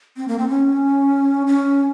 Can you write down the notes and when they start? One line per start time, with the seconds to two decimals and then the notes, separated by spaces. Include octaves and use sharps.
0.17 C4
0.28 A#3
0.38 C4
0.49 C#4
1.47 C#4